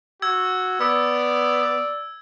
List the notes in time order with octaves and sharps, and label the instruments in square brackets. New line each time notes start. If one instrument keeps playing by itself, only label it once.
[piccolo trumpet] F#4 [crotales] E6 G#6
[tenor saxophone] B3 [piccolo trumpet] D5 [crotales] E6